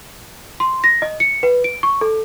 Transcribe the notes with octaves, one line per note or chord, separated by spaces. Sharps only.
C6
A#6
D#5
C#7
B4
D7
C#6
A4